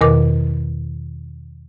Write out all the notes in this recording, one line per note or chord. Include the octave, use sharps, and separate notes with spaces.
E2 B2 D#3 A#4 D6